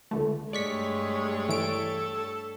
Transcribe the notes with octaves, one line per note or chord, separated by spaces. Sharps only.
C#2 D3 A3
G2 G#3 A3 C#5 D5 C#6 B6
E3 A4 D7